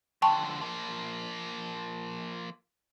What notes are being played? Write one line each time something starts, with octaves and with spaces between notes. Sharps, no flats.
D3 F3 G5 A5 C#6
F3 A#3